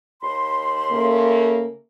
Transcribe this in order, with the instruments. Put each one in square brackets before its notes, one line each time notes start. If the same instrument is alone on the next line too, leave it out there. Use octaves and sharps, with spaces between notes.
[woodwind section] D#2 B5 C6
[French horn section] C#3 A3 A#3